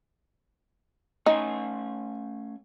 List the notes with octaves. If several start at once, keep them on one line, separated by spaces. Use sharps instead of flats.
A3 C#4 D#4 G#5